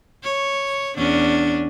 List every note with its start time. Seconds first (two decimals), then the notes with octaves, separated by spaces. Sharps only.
0.24 C#5
0.97 E2 C#4 D4